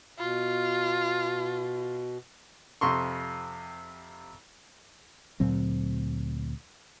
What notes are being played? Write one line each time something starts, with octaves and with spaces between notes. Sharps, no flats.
B2 F4
F2 C3 C6 C#6
D2 A#2 F#3 C4